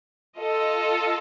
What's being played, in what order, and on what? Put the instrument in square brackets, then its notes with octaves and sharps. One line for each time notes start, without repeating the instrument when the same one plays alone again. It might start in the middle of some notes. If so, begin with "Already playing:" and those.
[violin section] F4 A4 D#5